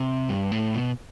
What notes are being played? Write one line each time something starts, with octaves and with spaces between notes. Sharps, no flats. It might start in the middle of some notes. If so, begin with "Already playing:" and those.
Already playing: C3
G2
A2
B2